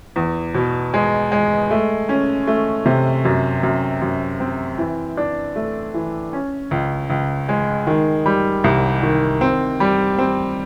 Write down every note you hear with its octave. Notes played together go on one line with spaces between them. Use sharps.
E2
B2
G#3
G#3
A3
C#4
A3
C3
F#2
F#2
F#2
C4
E3
D4
A3
E3
C#4
C#2
C#2
G#3
D#3
G3
C2
D#3
C4
G3
C4